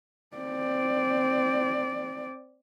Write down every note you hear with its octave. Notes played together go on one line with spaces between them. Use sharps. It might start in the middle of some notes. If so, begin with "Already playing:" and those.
C4 D5